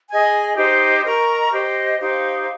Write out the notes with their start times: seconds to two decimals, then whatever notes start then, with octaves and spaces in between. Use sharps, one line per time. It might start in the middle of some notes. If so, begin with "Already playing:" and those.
0.09 G#4 D#5 G#5
0.57 D#4 G4 C5
1.05 A#4 D#5 A#5 C#6
1.52 G4 C5 D#5
1.99 D#4 G4 C5 F5